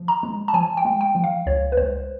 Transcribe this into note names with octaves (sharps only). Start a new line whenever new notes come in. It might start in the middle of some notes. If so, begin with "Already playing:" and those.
Already playing: F3
A#5
G#3
A5
F3 G#5
G5
G#3
G5
F3
F5
C#2 C#5
B4
C#2 C5